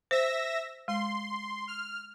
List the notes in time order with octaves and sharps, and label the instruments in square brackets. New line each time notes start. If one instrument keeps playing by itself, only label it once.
[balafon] C5 [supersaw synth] E5 E6 A#6
[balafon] G#3 [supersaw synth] C6
[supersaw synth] F6